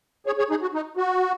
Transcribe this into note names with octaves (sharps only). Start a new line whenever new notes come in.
G#4 C#5
G#4 C#5
D#4 G#4
F#4
D#4
F#4